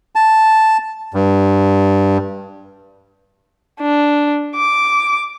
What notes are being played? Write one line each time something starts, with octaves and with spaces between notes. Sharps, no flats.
A5
G2
D4
D6